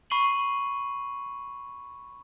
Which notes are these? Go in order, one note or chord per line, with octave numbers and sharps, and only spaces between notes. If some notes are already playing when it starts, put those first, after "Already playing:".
B5 C#6 C7 D#7 F#7